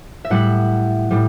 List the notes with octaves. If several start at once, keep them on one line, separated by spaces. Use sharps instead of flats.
E5
A2 G3 F#5
A2 G3